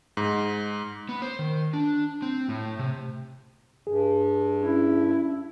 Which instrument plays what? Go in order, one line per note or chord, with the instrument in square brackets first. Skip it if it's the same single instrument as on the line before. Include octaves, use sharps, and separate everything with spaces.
[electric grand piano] G#2
[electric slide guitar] B3
C5
D#3
D4
C4
A2
C3
[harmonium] G2 [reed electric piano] G#4
[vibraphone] C#4 [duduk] E4